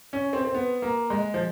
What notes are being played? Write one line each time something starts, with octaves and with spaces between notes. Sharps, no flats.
C#4
C4
C4
B3
A#3
G#3
F3